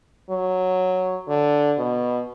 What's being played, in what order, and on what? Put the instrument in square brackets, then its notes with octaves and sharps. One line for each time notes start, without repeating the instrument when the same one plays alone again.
[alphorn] F#3
D3
B2